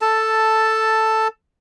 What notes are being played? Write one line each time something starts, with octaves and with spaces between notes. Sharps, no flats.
A4 A5